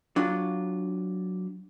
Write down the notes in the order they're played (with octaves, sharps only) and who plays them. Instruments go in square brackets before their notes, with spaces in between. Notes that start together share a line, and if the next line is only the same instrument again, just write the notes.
[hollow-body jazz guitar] F#3 D4 F4